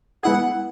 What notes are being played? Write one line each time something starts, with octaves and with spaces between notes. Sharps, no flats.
G#3 B3 E4 G#4 F#5